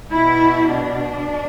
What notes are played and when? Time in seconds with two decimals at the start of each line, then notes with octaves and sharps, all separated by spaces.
0.12 B2 E4
0.71 D4